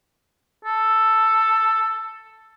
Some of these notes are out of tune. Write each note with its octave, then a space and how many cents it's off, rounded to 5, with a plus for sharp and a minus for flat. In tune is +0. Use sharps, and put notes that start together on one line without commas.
A4 +5